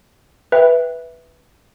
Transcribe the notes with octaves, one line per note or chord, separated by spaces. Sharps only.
B4 E5 G5